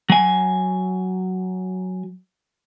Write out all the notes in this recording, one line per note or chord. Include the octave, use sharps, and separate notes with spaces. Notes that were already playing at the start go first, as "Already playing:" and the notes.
F#3 G#5